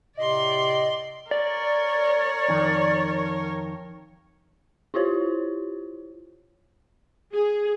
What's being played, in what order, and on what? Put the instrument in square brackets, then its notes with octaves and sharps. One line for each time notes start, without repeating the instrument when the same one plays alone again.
[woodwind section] A2 C3 [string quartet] D5 C6 [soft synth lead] D#5
[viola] A#4 C#5 [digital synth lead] D5
[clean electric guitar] F2 D#3
[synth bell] E4 F4 G4 C5 C#5
[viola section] G#4